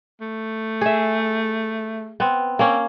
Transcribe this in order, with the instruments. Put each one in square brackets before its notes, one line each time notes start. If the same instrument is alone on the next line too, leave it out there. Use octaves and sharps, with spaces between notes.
[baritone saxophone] A3
[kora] G#4 E5
B3 C4
[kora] A#3 C#4 [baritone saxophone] C4